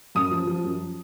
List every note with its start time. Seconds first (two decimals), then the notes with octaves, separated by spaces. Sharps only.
0.15 F#2 D#6
0.31 F3
0.47 F3
0.64 F#2